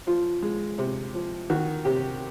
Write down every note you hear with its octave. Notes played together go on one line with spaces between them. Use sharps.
F3 F4
G#3
C3
F3
D#3 F#4
C3 G4